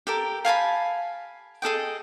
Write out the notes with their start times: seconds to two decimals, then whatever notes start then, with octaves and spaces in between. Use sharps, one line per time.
0.07 G4 A4 A#4
0.45 F5 G#5 A5 B5
1.62 G#4 A4 D#5 G5